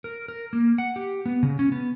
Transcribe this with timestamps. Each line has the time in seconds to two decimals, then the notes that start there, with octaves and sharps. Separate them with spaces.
0.04 A#4
0.28 A#4
0.53 A#3
0.78 F#5
0.96 G4
1.26 B3
1.43 C#3
1.59 C#4
1.72 B3